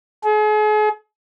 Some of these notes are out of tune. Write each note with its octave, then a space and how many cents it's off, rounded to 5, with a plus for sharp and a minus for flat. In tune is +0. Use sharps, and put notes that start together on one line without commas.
G#4 +40